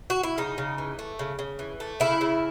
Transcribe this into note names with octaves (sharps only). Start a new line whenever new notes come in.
F#4
E4
C#3 D#4
C#3
E3
A3
C#3
C#3
E3
A3
C#3 E4
C#3